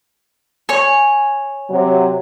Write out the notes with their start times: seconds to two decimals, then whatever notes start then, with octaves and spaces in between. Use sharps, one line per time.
0.69 C#5 G#5
1.70 C3 F#3